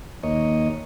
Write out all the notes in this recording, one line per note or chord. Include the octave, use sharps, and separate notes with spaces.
D#2 A#3 C#5 D#5